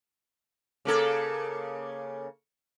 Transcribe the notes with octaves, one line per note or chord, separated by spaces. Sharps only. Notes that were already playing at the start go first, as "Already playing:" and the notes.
C#3 A#3 A4